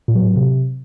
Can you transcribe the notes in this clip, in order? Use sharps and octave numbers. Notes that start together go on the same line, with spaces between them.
A#2
F#3
A2
F#3
C3